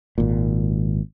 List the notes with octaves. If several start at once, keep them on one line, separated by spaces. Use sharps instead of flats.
G#1 A#2